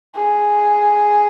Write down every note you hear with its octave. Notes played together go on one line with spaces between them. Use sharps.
G#4